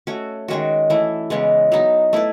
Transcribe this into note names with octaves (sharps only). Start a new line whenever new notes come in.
A3 C#4 F#4
D#3 G#3 C#4 F#4
E3 A3 E4
C#3 E3 G#3 B3
F#3 B3 D#4
A3 E4 B4